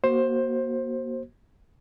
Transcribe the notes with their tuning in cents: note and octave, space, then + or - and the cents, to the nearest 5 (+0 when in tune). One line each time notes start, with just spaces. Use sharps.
A#3 +30 F#4 +15 C5 +15